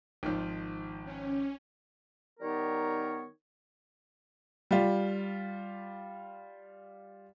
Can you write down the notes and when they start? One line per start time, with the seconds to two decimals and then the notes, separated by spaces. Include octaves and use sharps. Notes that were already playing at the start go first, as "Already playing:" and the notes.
0.23 G#1 D#3 F3
1.05 C#4
2.40 D#3 G3 B3 D#4 A#4 C#5
4.71 G3 F4